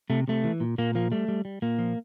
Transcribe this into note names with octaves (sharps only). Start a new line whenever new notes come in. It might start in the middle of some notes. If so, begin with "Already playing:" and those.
C3 A3
C3 A3
E3
A#2
A#2 A#3
F3 A#3
G3 A3
G3
G3
A#2 A#3
F3